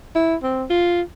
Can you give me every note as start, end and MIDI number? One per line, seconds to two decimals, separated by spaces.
0.15 0.35 64
0.43 0.65 60
0.70 1.02 65